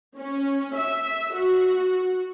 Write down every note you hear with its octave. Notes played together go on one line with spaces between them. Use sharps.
C#4
E5
F#4